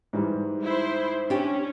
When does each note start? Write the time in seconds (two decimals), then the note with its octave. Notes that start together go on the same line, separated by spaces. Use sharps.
0.13 G#2 E3 G3
0.64 E4 C5
1.30 C#4 D4 G4